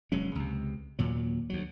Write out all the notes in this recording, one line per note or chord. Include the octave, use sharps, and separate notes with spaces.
F1 F#3 G#3 C#4
C#2 C3
D#2 A#2 F#3
D2 F#3